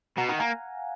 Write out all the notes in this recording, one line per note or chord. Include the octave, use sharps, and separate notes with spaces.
B2 F#5 A#5
D#3 F#5 A#5
A#3 F5 G#5